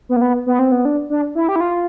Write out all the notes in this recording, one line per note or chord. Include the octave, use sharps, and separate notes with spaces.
B3
A#3
B3
B3
C4
B3
D4
D4
E4
G4
E4
F4